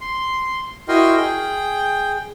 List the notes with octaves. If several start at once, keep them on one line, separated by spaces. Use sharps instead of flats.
C6
E4 F#4 A#4 D#5 G5 C6
G#4 G5